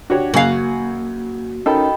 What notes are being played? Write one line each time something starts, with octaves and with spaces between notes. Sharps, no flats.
D4 F#4 G4 C#5
F#2 C#3 A#3 F#4 F5 G#5
C#4 D#4 A4 A#4 D#5 G5 B5